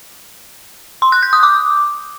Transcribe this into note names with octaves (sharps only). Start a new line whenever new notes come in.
C6
F#6
G6
D#6
D6